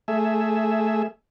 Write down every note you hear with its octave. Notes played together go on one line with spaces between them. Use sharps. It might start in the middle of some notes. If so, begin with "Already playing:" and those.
A3 G#4 E5